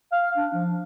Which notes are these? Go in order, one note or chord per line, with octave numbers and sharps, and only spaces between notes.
F5
D4
F3